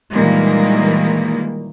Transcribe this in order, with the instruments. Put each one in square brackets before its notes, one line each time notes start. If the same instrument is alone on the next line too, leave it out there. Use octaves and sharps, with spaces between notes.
[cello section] A#2 D#3 E3 G3 G#3 A#3